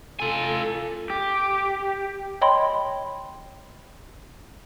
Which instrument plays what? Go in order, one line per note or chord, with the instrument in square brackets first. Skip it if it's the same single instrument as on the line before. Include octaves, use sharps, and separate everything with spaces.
[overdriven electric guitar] F4 G#5 [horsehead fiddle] A4
[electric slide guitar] G4
[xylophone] C#5 D#5 G5 B5 C6